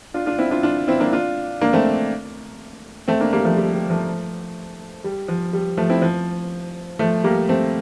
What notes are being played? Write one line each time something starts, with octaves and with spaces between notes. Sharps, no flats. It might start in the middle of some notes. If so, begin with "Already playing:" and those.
D4 F4
D4 F4
C4 E4
D4 F4
D4 F4
C4 E4
A#3 D4
D4 F4
A#3 D4
A3 C4
A3 C4
A#3 D4
G3 A#3
F3 A3
G3
G3
F3 A3
G3
F3
G3
F3 A3
C4 E4
F3
F3 A3
G3 A#3
A3 C4